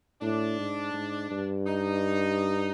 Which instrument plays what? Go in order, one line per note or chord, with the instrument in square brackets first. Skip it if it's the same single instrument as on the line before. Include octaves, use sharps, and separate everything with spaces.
[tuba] A2 [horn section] D4
[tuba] G#2
G#2
G2
[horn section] D#4